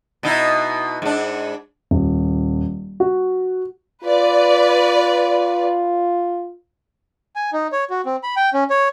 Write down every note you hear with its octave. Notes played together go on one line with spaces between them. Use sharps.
B2 D#4 E4
G#2 D4
D#1
F#4
F4 B4 D5
G#5
D#4
C#5
F#4
C4
B5
G5
C#4
C#5